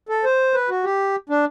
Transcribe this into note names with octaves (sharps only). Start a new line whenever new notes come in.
A4
C5
B4
F#4
G4
D4